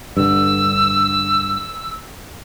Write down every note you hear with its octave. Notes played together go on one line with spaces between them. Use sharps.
G2 D3 E6